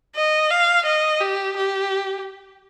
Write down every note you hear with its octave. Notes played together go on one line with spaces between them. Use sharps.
D#5
F5
D#5
G4
G4